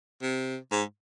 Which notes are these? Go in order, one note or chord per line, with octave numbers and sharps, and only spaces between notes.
C3
G#2